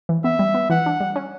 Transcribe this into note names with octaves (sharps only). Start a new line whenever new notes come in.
E3
B3 E5
G3
B3
E3 F#5
D4
G3
C#4